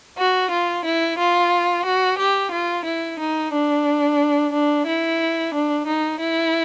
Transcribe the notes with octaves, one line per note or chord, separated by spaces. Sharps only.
F#4
F4
E4
F4
F#4
G4
F4
E4
D#4
D4
D4
E4
D4
D#4
E4